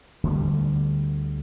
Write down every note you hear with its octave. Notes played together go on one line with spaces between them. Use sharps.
D2 D3 G3